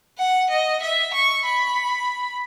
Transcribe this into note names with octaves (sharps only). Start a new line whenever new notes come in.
F#5
D#5
E5
C#6
B5